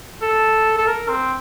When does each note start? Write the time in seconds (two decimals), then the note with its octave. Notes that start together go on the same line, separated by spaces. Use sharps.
0.22 A4
0.77 A4
0.87 A#4
1.09 C4